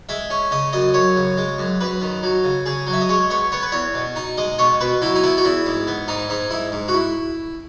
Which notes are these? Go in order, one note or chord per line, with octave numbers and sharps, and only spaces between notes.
G#3 E5
C#4
C#3 D#5
F#2 D#5
F#2 C#5
C#3
G#3
F#2
F#2 B4
D#3
F#3
C#3
C#3 G#4
F#3
E5
D#5
G#3 C#5
B3 C#5
B3 C#5
B4
E2 C#5
B2
D#4
G#3 D#5
B2 C#5
B2 B4
F#3 E4
D#4
B3 E4
F#4
E2 E4
G#2
B3
G#2 D#4
G#2 D#4
G#2 E4
G#2
F#4
E4